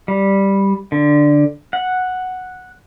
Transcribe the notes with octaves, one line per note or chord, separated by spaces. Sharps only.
G3
D3
F#5